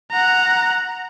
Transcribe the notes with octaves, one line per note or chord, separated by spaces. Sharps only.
F#5 A#5